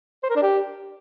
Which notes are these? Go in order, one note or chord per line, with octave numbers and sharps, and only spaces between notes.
C5
A#4
D4
G4